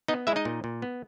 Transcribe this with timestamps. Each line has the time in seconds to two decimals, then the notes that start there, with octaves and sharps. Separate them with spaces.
0.08 B3 D#4 D#5
0.27 G#3 E4 E5
0.36 D#4 D#5
0.45 A#2
0.64 A#2
0.82 B3